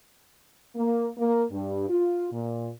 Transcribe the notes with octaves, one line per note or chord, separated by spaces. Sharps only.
A#3
A#3
G2
F4
A#2